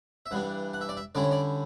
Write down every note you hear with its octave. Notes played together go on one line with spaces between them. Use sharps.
E5
G2 E3 G3 D4 F#5
F#5
E5
D5
E5
D3 G3 C#4 E4 D5
C#5
D5